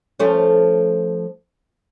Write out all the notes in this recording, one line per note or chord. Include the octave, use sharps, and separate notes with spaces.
F3 A3 C#4